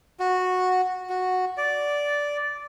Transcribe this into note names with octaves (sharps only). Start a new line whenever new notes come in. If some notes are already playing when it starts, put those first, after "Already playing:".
F#4
F#4
D5